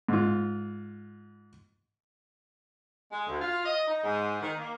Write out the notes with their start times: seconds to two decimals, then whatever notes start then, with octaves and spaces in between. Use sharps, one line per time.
0.09 G#2 F4
3.12 G#3
3.27 D2
3.41 F4
3.66 D#5
3.88 D#4
4.04 G#2
4.42 D#3
4.59 A#3